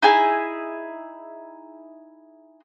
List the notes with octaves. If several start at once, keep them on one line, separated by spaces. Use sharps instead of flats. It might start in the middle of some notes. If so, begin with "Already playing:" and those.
D#4 E4 G#4 G#5